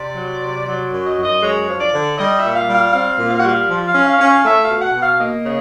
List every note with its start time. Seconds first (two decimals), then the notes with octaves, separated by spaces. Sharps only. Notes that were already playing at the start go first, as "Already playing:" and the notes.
Already playing: C3 D5
0.16 F#3
0.41 C3
0.66 F#3 D5
0.91 F#2
1.05 D#5
1.17 F#2
1.23 D#5
1.42 G#3 C#5
1.68 F3
1.80 D5
1.93 D3
2.18 G3 D#5
2.37 E5
2.43 A#2
2.55 F5
2.68 G3
2.74 F5
2.93 C4 F5
3.18 A#2
3.30 F5
3.39 F#5
3.44 G3 F5
3.69 F3
3.87 F5
3.93 C#4
4.07 F5
4.18 C#4
4.25 F5
4.44 A3 E5
4.63 F5
4.69 B2
4.82 F#5
4.94 B2
5.01 F5
5.19 A#3 D#5
5.45 C#3